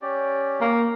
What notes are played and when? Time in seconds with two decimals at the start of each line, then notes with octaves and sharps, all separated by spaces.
0.02 C#4 G4 D5
0.61 A#3